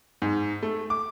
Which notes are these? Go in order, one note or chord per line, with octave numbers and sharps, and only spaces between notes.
G#2
A3
D6